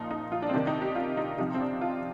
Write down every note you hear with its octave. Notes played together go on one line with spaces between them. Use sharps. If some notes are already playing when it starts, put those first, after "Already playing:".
Already playing: A#2 F3 D#4
D#4
F4
D4
C4
C3 D#3 D4
D#4
G4
F4
D#4
C3 F3 D#4
C4
D4
F4